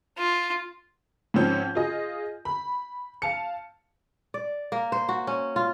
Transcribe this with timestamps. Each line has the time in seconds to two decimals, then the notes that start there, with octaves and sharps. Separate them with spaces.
0.18 F4
1.34 G#2 F3 C4 C#4 G6
1.75 F4 G#4 D#5
2.45 B5
3.22 F5 A5 C#7
4.34 D5
4.72 A#3
4.92 C5
5.09 F#4
5.27 C#4
5.56 F4